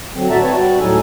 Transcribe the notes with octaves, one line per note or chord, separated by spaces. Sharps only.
D3 F#3 C4
A2 F#4 D5 E5 A5 A#5
C4 B4 C#5 A5
G3 F#4 G4 D5
D2 A2 F#3 D#4 A4 G#5